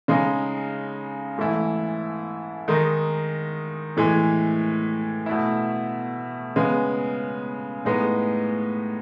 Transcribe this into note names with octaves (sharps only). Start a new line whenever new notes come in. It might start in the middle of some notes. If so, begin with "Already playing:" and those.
C#3 G#3 D#4
G#2 E3 A3 E4
D#3 G#3 D#4
A2 E3 G#3
B2 A3 E4
C#3 G#3 B3
A2 G#3 B3 D#4